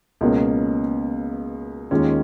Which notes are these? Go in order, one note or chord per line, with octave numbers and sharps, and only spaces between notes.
C#2 B2 A#3 C#4
D#2 D#3 G#3 C#4 F4